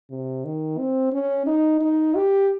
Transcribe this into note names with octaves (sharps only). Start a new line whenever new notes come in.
C3
D#3
C4
C#4
D#4
D#4
G4